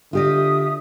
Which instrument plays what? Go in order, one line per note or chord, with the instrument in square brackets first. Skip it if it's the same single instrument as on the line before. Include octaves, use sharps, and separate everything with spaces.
[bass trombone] D3 [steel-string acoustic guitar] F4 G4 D#5 [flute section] E5 D#6